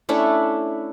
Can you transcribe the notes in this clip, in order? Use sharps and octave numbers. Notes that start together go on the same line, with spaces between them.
A3 C#4 D4 E4